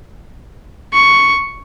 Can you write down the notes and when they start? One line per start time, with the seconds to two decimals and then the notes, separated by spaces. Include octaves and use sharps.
0.93 C#6